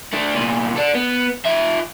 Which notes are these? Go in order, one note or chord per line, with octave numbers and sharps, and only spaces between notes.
A3 D4
C2 A#2
A4 D5
B3
F3 E5